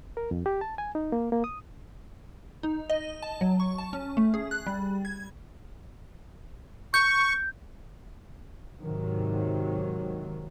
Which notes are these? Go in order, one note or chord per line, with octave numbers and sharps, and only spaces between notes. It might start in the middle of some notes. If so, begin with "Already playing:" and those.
A#4
F2
G4
A5
G#5
D#4
A#3
A#3
D#6
D#4
D#5
A5
F#3
C#6
A5
C#4
A3
G#4
F#6
G3
G#6
C#6 G6
G#2 C3 D#3 F#3